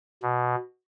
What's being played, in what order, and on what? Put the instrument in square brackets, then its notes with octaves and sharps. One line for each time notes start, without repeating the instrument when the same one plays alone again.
[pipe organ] B2